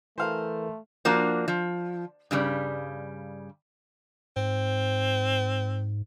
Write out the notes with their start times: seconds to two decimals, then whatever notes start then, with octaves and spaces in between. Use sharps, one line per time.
0.18 E3 A3 A4 A#4 C5 F5
1.05 F3 A#3 D4 F#4
1.48 F3
2.31 G2 C#3 G3
4.36 G#2 C4